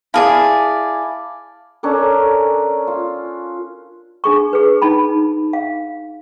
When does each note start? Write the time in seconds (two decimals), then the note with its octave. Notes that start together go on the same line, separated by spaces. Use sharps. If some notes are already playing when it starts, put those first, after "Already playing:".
0.14 E4 G#4 D5 F5 A5 F6
1.83 C#4 D4 A4 A#4
2.87 F4
4.24 D4 G#4 C#6
4.53 G#4 B4
4.82 D#4 A5 B5
5.53 F5